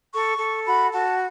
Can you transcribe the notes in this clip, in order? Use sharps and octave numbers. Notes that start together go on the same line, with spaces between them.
A4 C#6
A4
F#4 B5
F#4 A5